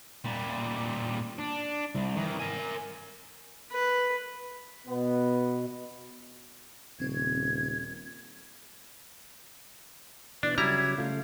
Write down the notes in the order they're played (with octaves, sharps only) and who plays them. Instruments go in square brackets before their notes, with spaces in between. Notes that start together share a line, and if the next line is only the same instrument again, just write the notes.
[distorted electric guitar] A#2 G3
D4
C2
D#3 E3
A#4 G#5
[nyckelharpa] B4
[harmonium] B2 [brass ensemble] B3
[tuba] D#1 [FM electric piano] C#3 C4 [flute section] G#6
[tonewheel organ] B2 E3 [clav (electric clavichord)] D4 [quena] D5
[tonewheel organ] C#3 F#3 [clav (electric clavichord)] G3 E4 A#5 [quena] G#6
[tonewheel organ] C#3 A3 F4 [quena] F5